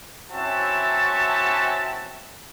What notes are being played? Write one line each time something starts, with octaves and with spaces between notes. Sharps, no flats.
C4 C#4 E4 F#4 E5 A5